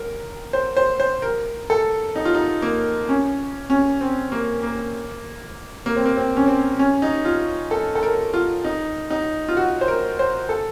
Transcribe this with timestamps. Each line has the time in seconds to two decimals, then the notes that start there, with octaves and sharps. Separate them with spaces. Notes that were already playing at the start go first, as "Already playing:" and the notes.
Already playing: A#4
0.53 C5
0.77 C5
1.00 C5
1.22 A#4
1.70 A4
2.16 D#4
2.25 F4
2.35 D#4
2.62 A#3
3.09 C#4
3.70 C#4
4.01 C4
4.32 A#3
4.63 A#3
5.86 A#3
5.96 C4
6.06 A#3
6.17 C4
6.37 C#4
6.48 C4
6.79 C#4
7.02 D#4
7.25 F4
7.71 A4
7.95 A4
8.03 A#4
8.34 F4
8.65 D#4
9.10 D#4
9.49 F4
9.57 F#4
9.81 C5
9.88 A#4
10.19 C5
10.49 A4